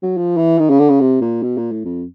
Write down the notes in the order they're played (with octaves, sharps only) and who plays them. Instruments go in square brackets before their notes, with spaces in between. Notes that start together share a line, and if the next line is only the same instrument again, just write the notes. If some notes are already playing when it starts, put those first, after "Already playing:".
[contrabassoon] F#3
F3
E3
D#3
C#3
D3
C#3
C3
A#2
B2
A#2
A2
F2